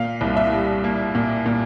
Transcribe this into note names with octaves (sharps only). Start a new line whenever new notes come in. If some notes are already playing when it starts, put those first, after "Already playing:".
Already playing: A#2 F5
C2
E5
G3
A#3
A#2
A#2